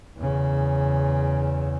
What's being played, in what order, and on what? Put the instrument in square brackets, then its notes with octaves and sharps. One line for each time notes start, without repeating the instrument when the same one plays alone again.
[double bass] E2 C#3